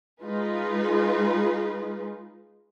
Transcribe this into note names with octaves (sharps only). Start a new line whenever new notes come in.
G#3 D#4 F4 G#4 B4